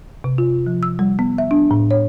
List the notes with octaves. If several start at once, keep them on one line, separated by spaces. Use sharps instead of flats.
C3
F4
F3
E6
G3
B3
E5
D4
A2
C#5